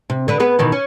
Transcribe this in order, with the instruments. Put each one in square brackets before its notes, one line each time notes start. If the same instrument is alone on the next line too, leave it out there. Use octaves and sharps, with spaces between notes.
[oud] C3
D3 B4
B3 G#4 B4
B2 D#3 E3
C#4